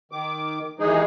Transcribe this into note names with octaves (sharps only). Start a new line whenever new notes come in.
D#3 D6
D#2 E3 G#3 D#4 G#4